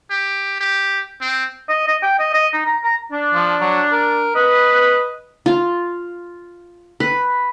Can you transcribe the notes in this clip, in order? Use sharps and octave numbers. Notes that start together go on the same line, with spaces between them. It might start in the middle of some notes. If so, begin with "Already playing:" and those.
G4
G4
C4
D#5
D#5
G5
D#5
D#5
D#4
A#5
A#5
D4
F3
F#3
A#4
B4 D#5
F4
B4